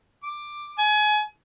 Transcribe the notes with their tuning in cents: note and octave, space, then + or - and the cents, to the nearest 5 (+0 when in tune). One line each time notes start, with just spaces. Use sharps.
D6 +10
G#5 +30